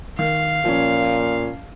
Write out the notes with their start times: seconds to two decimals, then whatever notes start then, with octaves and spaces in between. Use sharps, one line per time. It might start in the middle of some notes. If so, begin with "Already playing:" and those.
0.19 D#3 F5
0.65 A#2 F3 C#4